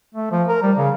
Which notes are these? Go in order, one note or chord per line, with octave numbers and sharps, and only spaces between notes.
A3
F3
A#4
G3
C#3